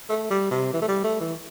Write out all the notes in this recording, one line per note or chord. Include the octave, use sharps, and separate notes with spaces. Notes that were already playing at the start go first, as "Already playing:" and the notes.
A3
G3
C3
E3
A3
G3
A3
E3